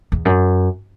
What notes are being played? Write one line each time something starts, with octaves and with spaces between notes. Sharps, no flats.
E2
F#2